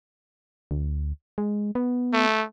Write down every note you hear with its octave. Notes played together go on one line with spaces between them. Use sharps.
D2
G#3
B3
A3